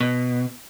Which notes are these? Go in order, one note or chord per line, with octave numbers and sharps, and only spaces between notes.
B2